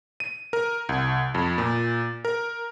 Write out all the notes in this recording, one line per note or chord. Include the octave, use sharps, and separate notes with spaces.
D#7
A#4
C2
F2
A#2
A#4